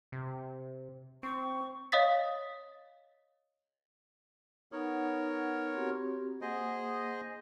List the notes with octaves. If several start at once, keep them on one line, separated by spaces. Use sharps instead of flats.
C3
C4 C#6
C#5 D#5 F5 D#6 A6 B6
B3 D#4 A#4 C#5 F#5
C4 F#4 G4
A#3 G#4 C5 D#5 F#5